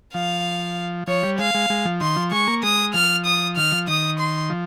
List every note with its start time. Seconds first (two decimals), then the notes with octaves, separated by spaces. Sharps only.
0.14 F3 F5
1.08 F3 C#5
1.23 G3
1.39 G#3 F5
1.55 G#3
1.70 G#3
1.85 F3
2.01 D#3 C6
2.16 F3
2.32 G#3 C#6
2.47 A#3
2.63 G#3 D#6
2.94 F3 F6
3.26 D#6
3.57 D#3 F6
3.72 F3
3.88 D#3 D#6
4.19 C6
4.50 F3